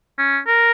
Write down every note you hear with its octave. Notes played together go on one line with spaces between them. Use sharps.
C#4
A#4